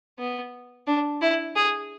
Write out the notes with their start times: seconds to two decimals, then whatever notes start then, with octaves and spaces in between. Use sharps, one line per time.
0.19 B3
0.87 D4
1.22 E4
1.56 G#4